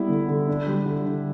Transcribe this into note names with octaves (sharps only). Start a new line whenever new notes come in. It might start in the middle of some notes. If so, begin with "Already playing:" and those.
Already playing: G3 B3 E4
D3
D3
D4
G3
D3
D3